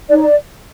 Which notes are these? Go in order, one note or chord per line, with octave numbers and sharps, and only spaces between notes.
D#4 D5
C#5
D5